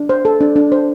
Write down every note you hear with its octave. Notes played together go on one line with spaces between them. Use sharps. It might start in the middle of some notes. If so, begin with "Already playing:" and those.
Already playing: D4
C5
A4
D4
D4
C5